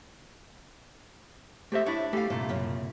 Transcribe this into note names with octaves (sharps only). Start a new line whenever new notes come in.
A3 G4 A4 C5 E5
D4 E4 C#5
A3 G4 A4 F5
C2 G2 A#2 A3
F#2 C#3 C#4